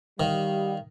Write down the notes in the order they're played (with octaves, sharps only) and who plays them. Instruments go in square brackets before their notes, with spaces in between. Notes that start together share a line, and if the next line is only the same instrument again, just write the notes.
[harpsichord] D#3 [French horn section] G3 [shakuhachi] F5